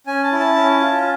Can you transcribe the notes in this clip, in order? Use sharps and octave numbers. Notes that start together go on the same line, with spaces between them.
C#4 G#5
A5
E4
A5
C#4
F4